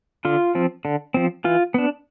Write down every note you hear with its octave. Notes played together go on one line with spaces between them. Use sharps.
D3 F4
F3 C4
D3
F3 C4
E3 F4
B3 D4